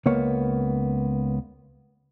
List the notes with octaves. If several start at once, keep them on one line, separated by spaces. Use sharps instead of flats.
C#2 A#3 B3 C#5